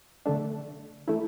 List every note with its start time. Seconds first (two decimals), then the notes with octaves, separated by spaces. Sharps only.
0.26 D3 A3 D4
1.08 E3 A3 E4